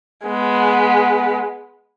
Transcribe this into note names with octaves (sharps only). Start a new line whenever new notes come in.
G#3 B3